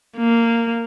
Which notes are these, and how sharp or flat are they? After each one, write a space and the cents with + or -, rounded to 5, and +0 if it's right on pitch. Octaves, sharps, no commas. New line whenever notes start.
A#3 -10